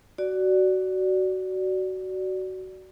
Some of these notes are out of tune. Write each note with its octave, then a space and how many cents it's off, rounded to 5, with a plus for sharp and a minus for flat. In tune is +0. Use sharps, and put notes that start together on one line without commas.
F#4 +15 D5 +0